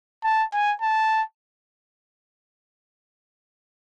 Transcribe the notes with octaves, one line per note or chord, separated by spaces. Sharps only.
A5
G#5
A5